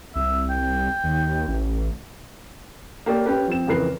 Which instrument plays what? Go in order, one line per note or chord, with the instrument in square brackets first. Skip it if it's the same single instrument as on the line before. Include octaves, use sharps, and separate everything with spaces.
[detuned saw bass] C2 [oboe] E5
[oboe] G5
[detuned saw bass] D#2
A1
[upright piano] A#3 G4 A#4 C#5 D5
C#4 G4 B4
F3 C4 E7
F2 C#3 E3 A#4 B4 C7